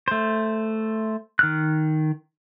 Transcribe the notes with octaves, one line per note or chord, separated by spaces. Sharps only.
A3 C5
D#3 F6 F#6